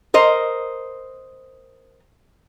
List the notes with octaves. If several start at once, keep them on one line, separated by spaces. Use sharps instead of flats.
A#4 C5 D#5